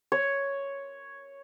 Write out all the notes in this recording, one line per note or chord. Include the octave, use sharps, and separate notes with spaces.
C#5